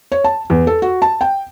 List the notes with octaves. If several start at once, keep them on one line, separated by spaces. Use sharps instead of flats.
C#5
A5
E2
A4
F#4
A5
G5